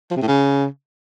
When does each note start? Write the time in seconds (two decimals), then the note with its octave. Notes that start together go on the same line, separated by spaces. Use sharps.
0.11 F3
0.16 C3
0.22 A2
0.28 C#3